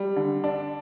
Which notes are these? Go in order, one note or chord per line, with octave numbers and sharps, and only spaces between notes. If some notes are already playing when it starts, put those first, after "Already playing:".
Already playing: G3
D3
D4